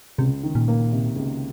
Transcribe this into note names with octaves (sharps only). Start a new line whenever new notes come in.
C#2 C3
D#3
A#2
A#3
C3
C#2